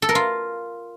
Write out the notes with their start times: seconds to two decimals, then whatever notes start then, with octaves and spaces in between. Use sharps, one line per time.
0.02 A4
0.09 A#4
0.15 F4